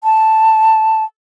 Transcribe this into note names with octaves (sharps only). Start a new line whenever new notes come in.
A5